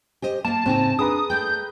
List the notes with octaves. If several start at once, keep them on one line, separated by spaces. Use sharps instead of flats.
G4 C5 D#5
A#3 F5 A5
A2 C#3 C4 D#4
D4 G#4 B4 A#5 D#6
A3 D5 G5 G6